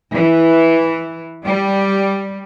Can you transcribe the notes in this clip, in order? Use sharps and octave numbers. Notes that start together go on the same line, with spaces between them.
E3
G3